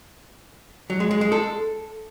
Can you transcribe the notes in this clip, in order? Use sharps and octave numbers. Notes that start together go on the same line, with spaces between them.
F#3
G#3
G#3
G#3
A4